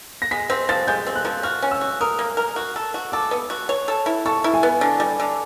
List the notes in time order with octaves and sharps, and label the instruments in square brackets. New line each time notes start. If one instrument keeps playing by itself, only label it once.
[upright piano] A#6
[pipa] G#3 [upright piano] B6
[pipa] C4 [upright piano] A#6
[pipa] F3 [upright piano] A6
[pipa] G#3 [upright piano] G6
[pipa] C4
[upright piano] F#6
[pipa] F3
[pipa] F#4 [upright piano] F6
[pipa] C#4
[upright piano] E6
[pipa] F#4
[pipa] A#4 [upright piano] D#6
[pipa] A#3
A#4
F#4
A4
F#4
[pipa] A4 [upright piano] D6
[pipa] B3
F#4
C#5
A4
E4
[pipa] A4 [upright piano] C#6
[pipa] E4
[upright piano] G#5
[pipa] B3
D3
G3
D3